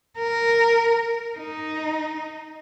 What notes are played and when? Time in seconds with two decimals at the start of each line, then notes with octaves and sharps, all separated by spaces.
0.19 A#4
1.38 D#4